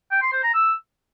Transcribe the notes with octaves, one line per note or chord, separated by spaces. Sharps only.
G5
C6
C5
A#5
E6